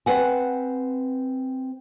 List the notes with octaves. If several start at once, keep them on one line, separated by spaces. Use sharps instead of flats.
C4 B4 F#5 G#5